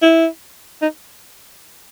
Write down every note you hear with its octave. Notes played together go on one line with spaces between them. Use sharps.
E4
D#4